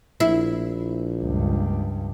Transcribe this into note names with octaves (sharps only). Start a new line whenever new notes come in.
A#1 E4
C#2 G2